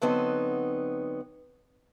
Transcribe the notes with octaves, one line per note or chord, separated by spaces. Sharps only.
D3 F#3 B3 C4 D#4